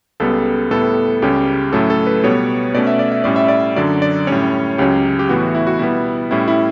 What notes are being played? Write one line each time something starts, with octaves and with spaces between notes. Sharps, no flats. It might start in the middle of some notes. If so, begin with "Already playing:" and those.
C#2 C#3 G3 B3 A4
A2 G3 B3 A4
C#2 C#3 G3 C#4 G4
A2 F#3 A3 C#4 A4
A4
B4
B2 G3 B3 C#5
B2 A3 C#4 D5
E5
D5
E5
A2 G3 C#4 D5
E5
D5
F#2 D3 F#3 D5
D5
A2 G3 C#4 C#5
C#2 C#3 F#3 C#4 G4
G4
A2 E3 B3 F#4
E4
F#4
B2 G3 B3 E4
A2 G3 C#4 E4
E4